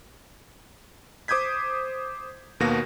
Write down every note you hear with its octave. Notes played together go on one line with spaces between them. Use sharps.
C5 D6 D#6 G6 G#6 B6
D#2 B2 A#3 B3 F#4 A#6